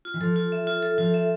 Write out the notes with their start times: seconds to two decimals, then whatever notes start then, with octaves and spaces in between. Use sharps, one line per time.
0.05 F4
0.14 E3
0.21 F3 A4
0.36 F4
0.52 E5
0.67 F4
0.83 A4
0.98 F3 F4
1.14 E5